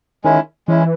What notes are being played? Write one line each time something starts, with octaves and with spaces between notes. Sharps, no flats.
D#3 G#3 C#4 E4
E3 G#3 C#4 E4